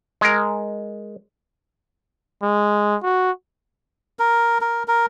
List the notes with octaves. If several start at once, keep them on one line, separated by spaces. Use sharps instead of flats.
G#3 A#4
G#3
F#4
A#4
A#4
A#4